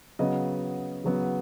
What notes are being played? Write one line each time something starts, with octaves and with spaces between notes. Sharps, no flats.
C#3 F#3 B3 D#5
C#3 F#3 B3